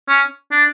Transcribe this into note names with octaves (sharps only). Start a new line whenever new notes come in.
C#4
D4